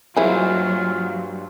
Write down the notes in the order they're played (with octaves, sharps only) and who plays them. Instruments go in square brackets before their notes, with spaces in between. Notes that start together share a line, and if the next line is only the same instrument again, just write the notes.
[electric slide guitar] G2 C5 [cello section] F#3 [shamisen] E4 G#4 [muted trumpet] F4